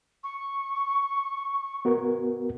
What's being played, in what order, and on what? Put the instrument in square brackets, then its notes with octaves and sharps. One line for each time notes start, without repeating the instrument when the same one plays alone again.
[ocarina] C#6
[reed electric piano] B3 F#4 A#4